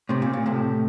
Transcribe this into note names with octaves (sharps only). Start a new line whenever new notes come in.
A2 C3
A#2
A#2
A2 C3